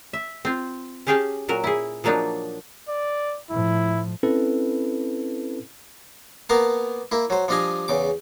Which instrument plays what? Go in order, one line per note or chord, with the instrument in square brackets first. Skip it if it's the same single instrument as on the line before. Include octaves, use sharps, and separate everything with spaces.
[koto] E5
C4 F4
C#4 G4 G#4 F5 G5 A5
A#2 F#3 A#4
E4 G#4
F3 F#3 A#3 D4 D#4
[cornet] D5
[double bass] A2 F3 [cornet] E4
[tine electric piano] C4 C#4 E4 A4 B4
[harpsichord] A#3 B3 A#4 F5 A5
A#3 E4
F#3 C5
F3 G3 D4 D#5 F5 G#5
E2 C#3 D6